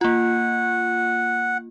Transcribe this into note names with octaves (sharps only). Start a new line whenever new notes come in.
A#3 F4 F#5